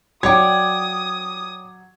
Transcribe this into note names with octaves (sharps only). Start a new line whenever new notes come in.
F#3 C#5 D5 G5 D6 D#6 G#6